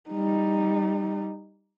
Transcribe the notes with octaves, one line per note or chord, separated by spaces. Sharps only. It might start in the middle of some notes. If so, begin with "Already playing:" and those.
G3 D#4